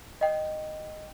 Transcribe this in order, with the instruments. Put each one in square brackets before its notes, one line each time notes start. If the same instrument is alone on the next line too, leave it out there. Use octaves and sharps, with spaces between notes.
[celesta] D#5 G5